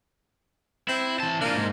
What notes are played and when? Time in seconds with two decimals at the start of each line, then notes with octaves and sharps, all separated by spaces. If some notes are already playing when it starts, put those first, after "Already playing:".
0.88 C4 E4
1.20 E3 A5
1.41 A#3 D4 F4
1.55 G#2